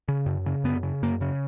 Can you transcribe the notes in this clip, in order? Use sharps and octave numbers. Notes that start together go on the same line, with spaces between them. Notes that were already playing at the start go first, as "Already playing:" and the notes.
C#3
F#2
C#3
F#2 B3
C#3
F#2 A#3
C#3